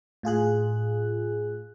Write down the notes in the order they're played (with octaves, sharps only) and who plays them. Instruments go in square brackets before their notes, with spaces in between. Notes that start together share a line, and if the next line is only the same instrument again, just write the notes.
[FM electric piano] A2 F4 G#4 F#6